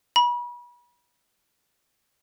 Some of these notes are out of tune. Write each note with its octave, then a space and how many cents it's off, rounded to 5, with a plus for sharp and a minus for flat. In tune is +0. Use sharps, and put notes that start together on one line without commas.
B5 -35